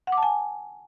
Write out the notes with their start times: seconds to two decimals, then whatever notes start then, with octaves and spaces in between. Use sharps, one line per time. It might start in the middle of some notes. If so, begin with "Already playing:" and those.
0.07 F#5
0.12 D6
0.17 A5
0.23 G#5